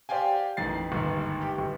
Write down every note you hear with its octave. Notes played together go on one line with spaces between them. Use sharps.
G4 C5 D5 F5 G5 G#5
A1 F2 D#3 A6 C7
G1 D#2 G#2
G4
G1